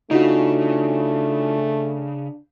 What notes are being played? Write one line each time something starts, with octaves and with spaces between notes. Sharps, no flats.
C#3 A3 D4 D#4 F4 F#4